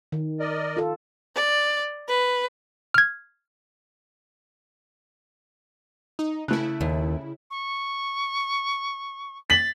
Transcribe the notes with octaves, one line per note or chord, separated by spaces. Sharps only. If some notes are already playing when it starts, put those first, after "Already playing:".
D#3
A#4 D5 D#5
F4 A4
D5
B4
F6 G#6
D#4
C#3 A3 E4 F#6
D#2
C#6
A6 B6 F#7